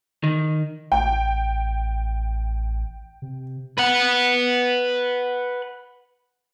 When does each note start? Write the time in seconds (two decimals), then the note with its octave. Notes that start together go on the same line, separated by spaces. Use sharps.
0.24 D#3
0.92 A1 G5
3.22 C3
3.78 B4 F#5